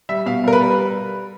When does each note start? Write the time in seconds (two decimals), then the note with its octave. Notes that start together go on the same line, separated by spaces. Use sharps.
0.09 G3 E5
0.26 B2 F5
0.44 G3 A#4
0.53 B4
0.61 G3